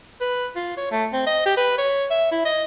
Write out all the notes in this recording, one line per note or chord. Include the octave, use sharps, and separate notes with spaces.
B4
F4
C#5
A3
C4
D#5
G4
B4
C#5
E5
E4
D#5